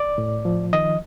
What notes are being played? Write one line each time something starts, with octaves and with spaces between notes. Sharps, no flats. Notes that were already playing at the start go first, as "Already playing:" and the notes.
Already playing: D5
A2
F3
D#3 D#5